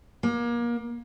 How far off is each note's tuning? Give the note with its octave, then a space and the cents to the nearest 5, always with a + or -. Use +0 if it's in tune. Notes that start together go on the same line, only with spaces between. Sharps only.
A#3 +30